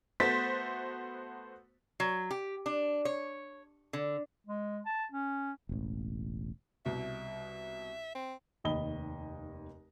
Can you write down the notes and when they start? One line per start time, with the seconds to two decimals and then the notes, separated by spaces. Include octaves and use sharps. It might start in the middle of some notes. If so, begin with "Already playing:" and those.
0.20 A3 B3 F#4 C5 A6 B6
2.00 F#3
2.31 G4
2.66 D4
3.05 C#5
3.93 D3
4.47 G#3
4.86 A5
5.12 C#4
5.69 E1 A1
6.85 C2 B2 E5
8.15 C4
8.64 F1 D#2 D#5 B5 G7